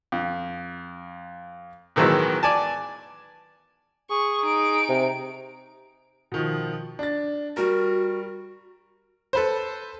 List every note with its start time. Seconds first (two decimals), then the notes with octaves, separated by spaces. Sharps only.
0.12 F2
1.96 A2 D#3 E3 F#3 G#3 B3
2.43 D5 G#5 A5
4.10 G#4 C#6
4.43 D#4 D7
4.89 C3
6.32 B2 D#3 F3
6.99 D4 A6
7.57 G3 F#4 A#4
9.33 A4 B4 C5